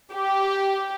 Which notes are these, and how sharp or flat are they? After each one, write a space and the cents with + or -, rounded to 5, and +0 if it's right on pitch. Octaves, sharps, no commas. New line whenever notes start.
G4 -10